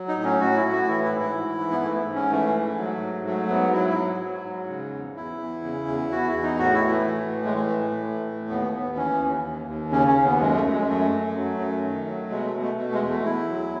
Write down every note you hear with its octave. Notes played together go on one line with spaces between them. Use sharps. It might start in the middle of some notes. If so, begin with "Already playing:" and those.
Already playing: F#3
D#4
A2
C#4
A2 F#4
E4
A2
F#4
E3 E4
E4
G#2
E4
G#2
E3
B3
G#2 A3
G#2
C#4
E3 A3
G#2
F#3
G#2
F#3 A3
G#2 B3
F#3 E4
E4
F#3
F#3
G#2
C#3
E2
E2 E4
E2
C#3
E2
E2 F#4
E4
E2
D#4
A2 F#4
E4
E3
A3
E3
A2
G#3
E3 A3
A2
E3
A2
D#2 B3
D#2 B3
E3 C#4
D#2
D#2
D#2
C#3 C#4
C#4
D#2
B3
F#2 G#3
A3
F#2
G#3
F#2 A3
F#2
F#3
F#2
D#3
F#3
B2 G#3
A3
B2
A3
B2 A3
G#3
E2
A3
E2 E4
F#3